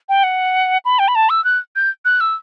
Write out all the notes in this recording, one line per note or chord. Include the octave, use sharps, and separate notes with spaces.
G5
F#5
B5
G5
B5
A5
E6
F#6
G6
F#6
E6